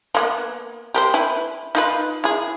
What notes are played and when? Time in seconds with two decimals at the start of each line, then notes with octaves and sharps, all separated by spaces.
0.15 F3 A#3 B3
0.94 G4 A#4 C5
1.14 E4 B4
1.75 D#4 F4 B4
2.24 E4 G#4